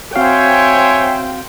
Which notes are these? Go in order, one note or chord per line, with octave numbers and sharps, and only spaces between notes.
C4 F#4 C5 C#5 E5 F5 G5 G#5